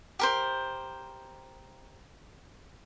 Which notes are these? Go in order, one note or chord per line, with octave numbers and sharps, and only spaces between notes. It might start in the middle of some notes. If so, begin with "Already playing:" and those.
G4 A#4 C5